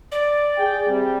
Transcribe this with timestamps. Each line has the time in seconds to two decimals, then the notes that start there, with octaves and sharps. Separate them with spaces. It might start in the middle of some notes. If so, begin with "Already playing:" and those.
0.11 D5
0.57 G#4 G5
0.87 C3 G3